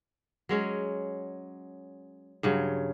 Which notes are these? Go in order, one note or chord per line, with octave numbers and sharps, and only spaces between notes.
F#3 G#3 C#4
G2 C#3 F#3